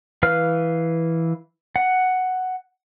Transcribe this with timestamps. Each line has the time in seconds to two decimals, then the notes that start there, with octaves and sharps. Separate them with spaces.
0.23 E3 B4 F5 F6
1.76 F#5